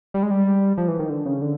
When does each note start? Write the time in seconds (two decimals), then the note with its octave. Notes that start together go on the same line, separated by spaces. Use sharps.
0.14 G3
0.23 G#3
0.31 G3
0.78 F3
0.88 E3
0.99 D#3
1.10 D3
1.25 C#3
1.42 D3